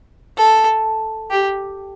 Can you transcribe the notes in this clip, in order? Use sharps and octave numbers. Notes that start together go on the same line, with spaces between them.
A4
G4